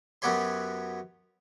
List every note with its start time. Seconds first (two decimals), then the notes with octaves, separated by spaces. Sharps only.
0.22 F#2 F#3 B3 G4 C#5 C6